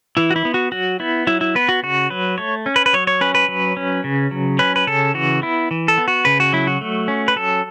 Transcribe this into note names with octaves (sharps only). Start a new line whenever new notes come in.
E3 E4
F#4
E4
B3
F#4
F#3 F#4
B3 E4
F#3 E4
E4
B3 B4
F#4
C#3 F#4
F#3 B4
A3 C#5
C#4
B4
B4
F#3 C#5
C#5
C#4 B4
B4
F#3
C#4
C#3
F#3
C#4 B4
B4
C#3 A4
E3 F#4
B3 E4
E3
A4
B3
F#4
C#3 B4
F#4
F#3 E4
F#4
A3
C#4
B4
F#3 A4